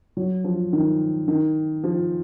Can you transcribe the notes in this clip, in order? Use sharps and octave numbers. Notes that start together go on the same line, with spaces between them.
F#3
F3
D#3
D#3
F3